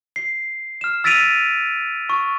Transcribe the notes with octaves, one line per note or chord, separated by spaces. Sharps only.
C7
F6 E7
E6 A6 B6 D7 D#7 F7
C#6